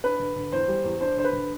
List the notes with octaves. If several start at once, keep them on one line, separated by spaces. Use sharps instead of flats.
D4 B4
D3
D3
E2 C5
G3
E2
D4 C5
D3 C5
B4
D3